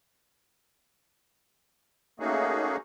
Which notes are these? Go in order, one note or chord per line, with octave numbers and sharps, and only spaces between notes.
A3 A#3 C#4 D#4 F#4 G#4